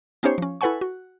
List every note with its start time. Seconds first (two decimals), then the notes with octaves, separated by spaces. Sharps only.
0.23 B3 C#4 D#4 G4 C5 C#5
0.38 F3 C#4
0.61 E4 A4 B4 F#5 G#5 C#6
0.81 F#4